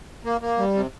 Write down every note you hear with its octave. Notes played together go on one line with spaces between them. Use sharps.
A#3
A#3
G3
C3